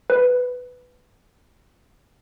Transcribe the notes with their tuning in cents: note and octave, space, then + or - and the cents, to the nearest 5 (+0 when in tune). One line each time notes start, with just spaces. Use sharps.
B4 +10